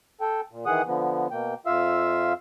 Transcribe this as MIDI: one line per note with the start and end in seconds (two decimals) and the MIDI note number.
0.21 0.41 69
0.21 0.41 79
0.52 0.65 46
0.66 0.82 51
0.66 0.82 52
0.66 0.82 68
0.66 0.82 78
0.66 0.82 87
0.86 1.28 50
0.86 1.28 53
0.86 1.28 59
1.31 1.54 47
1.31 1.54 58
1.31 1.54 79
1.66 2.33 41
1.66 2.33 65
1.66 2.33 76
1.66 2.33 77
1.66 2.33 88